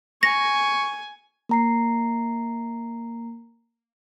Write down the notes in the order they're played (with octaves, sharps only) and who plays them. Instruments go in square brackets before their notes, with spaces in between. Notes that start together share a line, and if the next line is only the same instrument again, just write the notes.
[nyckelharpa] G#5 [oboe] C#6 [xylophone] A#6
[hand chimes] A#3 A#5 C7